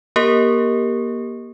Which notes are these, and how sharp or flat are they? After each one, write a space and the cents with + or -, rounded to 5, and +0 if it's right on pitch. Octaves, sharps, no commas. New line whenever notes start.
A#3 +30 G4 +0 A#4 -10